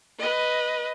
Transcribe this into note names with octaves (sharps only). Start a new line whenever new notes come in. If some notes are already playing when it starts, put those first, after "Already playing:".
B4 D#5